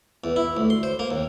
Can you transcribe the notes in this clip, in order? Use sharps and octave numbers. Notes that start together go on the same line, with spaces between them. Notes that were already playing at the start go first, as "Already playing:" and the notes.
E2
E4
D2
C6
C5
A#3
D#2